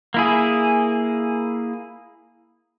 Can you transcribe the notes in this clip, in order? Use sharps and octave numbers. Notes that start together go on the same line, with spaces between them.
A#3 E4 G#4